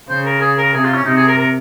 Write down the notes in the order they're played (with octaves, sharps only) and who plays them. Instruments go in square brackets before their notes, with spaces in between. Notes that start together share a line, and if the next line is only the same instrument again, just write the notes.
[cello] C#3 [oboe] C5
[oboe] A#4
G#4
A#4
[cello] C3 [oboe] G#4
[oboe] F4
C#4
[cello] C3 [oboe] D#4
[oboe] G#4
A#4
A#4